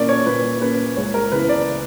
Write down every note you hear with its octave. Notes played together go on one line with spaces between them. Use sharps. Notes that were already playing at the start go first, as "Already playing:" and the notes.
Already playing: A#2 A#3 C#4 D5
C#5
A#2 B4
A#3 C#4 B4
C#2 C#5
A#4
C#3 E3 B3 B4
D5